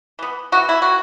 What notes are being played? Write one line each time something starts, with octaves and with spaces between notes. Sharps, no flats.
E3 B3
E3 B3 F#4
E4
D#3 F#4